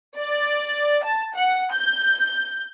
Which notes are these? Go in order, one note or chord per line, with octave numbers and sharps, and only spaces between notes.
D5
A5
F#5
G6